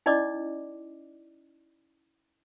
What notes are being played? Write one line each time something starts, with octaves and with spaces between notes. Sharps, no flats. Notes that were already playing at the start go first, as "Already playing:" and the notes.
C#4 D#4 E4 D5 D#5 D6